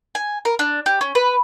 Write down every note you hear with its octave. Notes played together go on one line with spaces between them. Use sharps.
G#5
A#4
D4
G4
C#4
B4